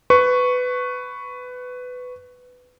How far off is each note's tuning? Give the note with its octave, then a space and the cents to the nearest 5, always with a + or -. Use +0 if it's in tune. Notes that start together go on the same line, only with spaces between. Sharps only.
B4 +15 C#6 +0